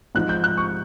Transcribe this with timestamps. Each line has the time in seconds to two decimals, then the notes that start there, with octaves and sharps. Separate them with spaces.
0.15 G#2 F3 F#6
0.29 G6
0.44 F#6
0.57 C#6